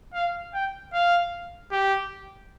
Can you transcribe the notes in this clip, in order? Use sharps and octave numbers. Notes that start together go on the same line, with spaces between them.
F5
G5
F5
G4